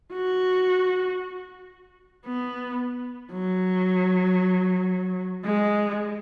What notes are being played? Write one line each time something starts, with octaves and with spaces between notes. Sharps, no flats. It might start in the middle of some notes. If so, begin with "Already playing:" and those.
F#4
B3
F#3
G#3